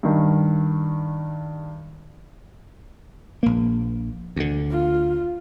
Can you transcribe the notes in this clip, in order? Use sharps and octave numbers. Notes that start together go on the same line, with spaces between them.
G2 D#3
A#1 A#3
D2 D3
F4